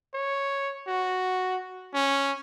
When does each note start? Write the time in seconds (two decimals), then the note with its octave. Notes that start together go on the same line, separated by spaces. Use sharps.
0.14 C#5
0.87 F#4
1.94 C#4